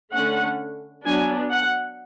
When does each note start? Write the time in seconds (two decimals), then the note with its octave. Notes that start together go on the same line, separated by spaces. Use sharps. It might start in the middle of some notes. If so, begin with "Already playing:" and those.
0.13 D3 A3 C#4 F#5
1.05 F#3 B3 D4 G#5
1.51 F#5